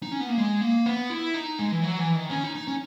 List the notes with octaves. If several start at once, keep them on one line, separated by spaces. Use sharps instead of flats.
D#4
C#4
B3
A#3
G#3
A#3
B3
E4
D#4
G#3
E3
F#3
E3
D#3
C#4
D#4
D#4
C#4